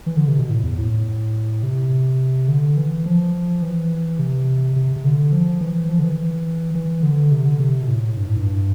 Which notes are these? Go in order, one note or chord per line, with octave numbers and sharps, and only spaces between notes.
E3
D3
C3
B2
A2
E2
A2
C3
D3
E3
F3
E3
C3
C3
C3
D3
F3
E3
F3
D3
E3
E3
D3
C3
D3
C3
B2
A2
G2
A2
G2